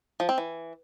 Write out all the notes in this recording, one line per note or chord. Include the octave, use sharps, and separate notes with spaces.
F3
C4
E3